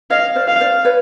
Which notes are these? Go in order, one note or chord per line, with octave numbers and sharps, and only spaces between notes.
C#5 D#5 F5
C5 D5
F5
C5 D5
B4 C#5